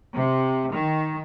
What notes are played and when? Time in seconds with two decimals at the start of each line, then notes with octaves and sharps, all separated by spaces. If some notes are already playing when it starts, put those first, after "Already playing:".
0.14 C3
0.72 D#3